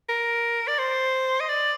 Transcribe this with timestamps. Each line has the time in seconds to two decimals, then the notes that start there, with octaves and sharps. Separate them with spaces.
0.09 A#4
0.67 D5
0.79 C5
1.40 D#5
1.49 D5